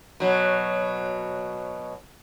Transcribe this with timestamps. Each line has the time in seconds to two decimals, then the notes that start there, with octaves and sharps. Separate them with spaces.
0.20 B2 F#3